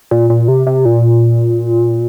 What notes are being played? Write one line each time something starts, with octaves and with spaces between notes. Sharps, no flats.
A#2
A#2
C3
C3
A#2